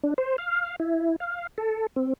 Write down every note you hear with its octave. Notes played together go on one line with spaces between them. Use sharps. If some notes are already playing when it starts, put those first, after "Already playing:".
D4
C5
F5
E4
F5
A4
C4